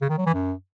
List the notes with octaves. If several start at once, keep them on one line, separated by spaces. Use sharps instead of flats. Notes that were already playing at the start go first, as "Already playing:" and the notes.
C#3
D#3
F#3
E3
F#2